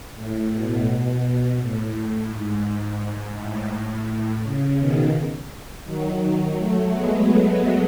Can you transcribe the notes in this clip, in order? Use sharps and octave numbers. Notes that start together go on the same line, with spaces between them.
A2
B2
A2
G#2
A2
C#3
B2 D#3
D#3 F#3
F#3 A3
G#3 B3